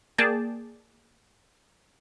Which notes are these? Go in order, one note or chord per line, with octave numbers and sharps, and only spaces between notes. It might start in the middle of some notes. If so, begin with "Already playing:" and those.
A#3 G#4 D5 G5 A5